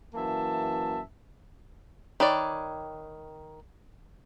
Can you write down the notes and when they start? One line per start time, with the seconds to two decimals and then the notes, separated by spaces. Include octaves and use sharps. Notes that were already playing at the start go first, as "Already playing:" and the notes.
0.14 F#2 E3 A#3 E5 A5
2.20 D#3 B4 C#5 D5